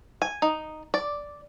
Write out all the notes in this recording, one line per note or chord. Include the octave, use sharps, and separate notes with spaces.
G#5
D#4
D5